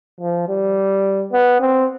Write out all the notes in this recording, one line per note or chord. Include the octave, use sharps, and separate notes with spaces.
F3
G3
B3
C4